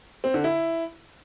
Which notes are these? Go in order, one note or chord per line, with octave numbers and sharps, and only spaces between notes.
C4
D3
E4